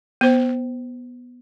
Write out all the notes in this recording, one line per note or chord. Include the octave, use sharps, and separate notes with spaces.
B3 C5